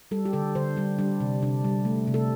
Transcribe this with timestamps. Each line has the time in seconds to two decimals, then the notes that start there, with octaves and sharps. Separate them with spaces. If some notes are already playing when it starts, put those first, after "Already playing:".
0.11 G3 A4
0.25 G4
0.33 D3 A4
0.55 D3 C5
0.76 G3 D4
0.99 G3 D4
1.20 C3
1.42 C3 D4
1.64 G3
1.85 A3
2.07 C3
2.14 A4